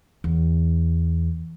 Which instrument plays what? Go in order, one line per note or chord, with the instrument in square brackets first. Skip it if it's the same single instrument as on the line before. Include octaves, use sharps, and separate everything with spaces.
[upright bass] E2